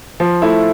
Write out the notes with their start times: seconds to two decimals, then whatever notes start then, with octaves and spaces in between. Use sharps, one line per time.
0.20 F3
0.42 A3 E4